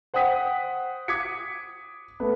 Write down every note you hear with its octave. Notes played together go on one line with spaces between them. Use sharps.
C5 F#5 G5 D#6 B6
D6 D#6 G#6 B6 C#7
A3 B3 B4